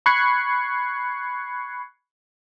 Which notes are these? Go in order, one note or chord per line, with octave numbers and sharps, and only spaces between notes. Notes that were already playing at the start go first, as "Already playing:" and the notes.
B5 C#6 F#6 G#6 C7 C#7